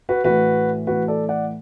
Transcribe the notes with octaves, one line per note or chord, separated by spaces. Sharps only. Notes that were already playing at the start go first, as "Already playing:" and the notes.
F#4 B4
A2 E3 F#4 B4
A2 E3 F#4 B4
A4 D5
D5 F#5